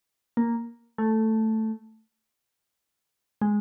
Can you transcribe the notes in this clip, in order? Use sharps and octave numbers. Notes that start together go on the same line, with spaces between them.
A#3
A3
G#3